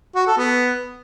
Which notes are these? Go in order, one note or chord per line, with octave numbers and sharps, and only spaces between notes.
F#4
A4
B3